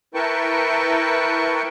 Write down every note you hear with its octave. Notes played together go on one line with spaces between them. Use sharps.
E4 A#4 B4 G5 A5 C#6